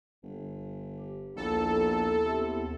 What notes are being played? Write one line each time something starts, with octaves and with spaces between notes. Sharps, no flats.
G1
G4
A#1 D#2 B3 E4 A4
C3